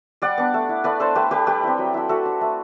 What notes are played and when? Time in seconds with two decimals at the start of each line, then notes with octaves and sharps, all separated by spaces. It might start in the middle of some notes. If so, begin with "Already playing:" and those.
0.22 G3 D5 F#5
0.38 B3 D4
0.54 A3
0.69 E4
0.84 A3 B4 D5
1.00 D4 A4 C5
1.15 A3 G4 B4
1.31 D4 G4 B4
1.47 G3 G4 B4
1.63 C4 E4
1.78 F#3
1.94 A3 E4
2.09 A3 F#4 A4
2.26 D4
2.41 A3